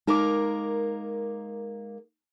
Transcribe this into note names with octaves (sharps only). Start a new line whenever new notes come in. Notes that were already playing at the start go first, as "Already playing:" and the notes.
G#3 A#3 D#4 A#4 D6